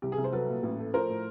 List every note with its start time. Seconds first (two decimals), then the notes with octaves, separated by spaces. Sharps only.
0.02 C2 G4
0.12 G#4
0.18 C2
0.24 C5
0.32 F#3 A4 B4
0.48 A#2
0.63 A1
0.79 A3
0.94 F3 A#4 C5
1.09 A2